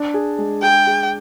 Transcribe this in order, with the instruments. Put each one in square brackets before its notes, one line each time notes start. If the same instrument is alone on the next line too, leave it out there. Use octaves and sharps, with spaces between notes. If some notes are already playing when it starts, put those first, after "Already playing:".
Already playing: [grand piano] D4
G#4
G#3
[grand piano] G#4 [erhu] G5
[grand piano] G#4